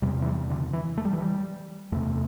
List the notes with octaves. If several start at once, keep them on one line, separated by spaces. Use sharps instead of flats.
E2 C3 G3
E3
G3
D3
E3
A3
G3
E3
G3
E2 C3 A3